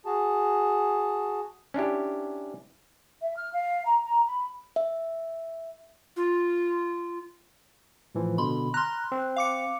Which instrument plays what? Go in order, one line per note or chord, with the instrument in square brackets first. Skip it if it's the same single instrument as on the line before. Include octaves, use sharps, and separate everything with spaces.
[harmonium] F#4 G#4 A5
[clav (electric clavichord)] C#4 D4 E4 G4
[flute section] E5
F6
F5
A#5
A#5
B5
[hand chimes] E5
[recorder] F4
[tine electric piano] A2 E3 F3
[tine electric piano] B2 D3 [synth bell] B5 C6
[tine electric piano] A#5 F6 [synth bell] C6 F#6
[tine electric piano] C4
[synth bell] F5 D6 C#7